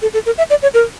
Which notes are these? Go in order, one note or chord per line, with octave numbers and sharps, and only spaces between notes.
A4
A4
A#4
E5
D5
C#5
A#4